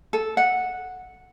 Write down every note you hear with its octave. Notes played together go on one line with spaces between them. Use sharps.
A4
F#5